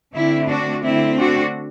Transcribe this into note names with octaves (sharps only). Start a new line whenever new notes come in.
D3 A3 C4 E4
D4 F#4
D3 A3 C4 E4
D4 F#4